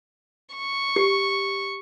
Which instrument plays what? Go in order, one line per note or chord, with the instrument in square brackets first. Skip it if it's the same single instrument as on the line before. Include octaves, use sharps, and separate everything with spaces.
[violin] C#6
[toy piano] G4